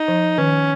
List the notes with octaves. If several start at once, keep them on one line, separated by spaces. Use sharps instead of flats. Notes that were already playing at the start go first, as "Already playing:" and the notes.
Already playing: D#4
F3
D#3 C#4